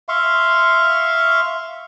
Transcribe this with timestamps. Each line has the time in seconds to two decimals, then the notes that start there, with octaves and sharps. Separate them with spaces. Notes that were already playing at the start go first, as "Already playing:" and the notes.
0.09 E5 F5 C6 C#6